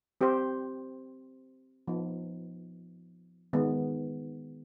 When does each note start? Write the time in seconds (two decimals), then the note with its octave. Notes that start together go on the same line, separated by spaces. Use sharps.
0.21 C4 G4 C5
1.88 F3 B3 D#4 B4
3.53 D#3 G#3 B3